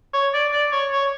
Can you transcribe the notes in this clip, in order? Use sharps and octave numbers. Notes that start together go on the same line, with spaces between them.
C#5
D5
D5
C#5
C#5